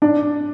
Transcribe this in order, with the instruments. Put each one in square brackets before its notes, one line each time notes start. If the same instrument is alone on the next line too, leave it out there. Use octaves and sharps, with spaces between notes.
[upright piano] D4